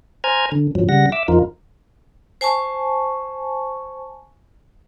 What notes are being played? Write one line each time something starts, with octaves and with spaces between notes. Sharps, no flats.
C5 G#5 A#5 F6 G#6
D3
G2 F3 F#3
C#3 G3 F#5 A#6
E5 D6 E6
F2 F3 D#4 F4 A#4
C5 G#5 A5 C#6